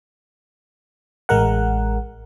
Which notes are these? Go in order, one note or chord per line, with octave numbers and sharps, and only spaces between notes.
A1 G#3 A#4 F#5